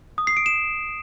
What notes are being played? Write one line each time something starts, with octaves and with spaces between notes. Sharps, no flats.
D#6
C7
D7
E7